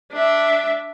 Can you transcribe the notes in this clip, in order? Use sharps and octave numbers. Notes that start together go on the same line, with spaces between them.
D4 E5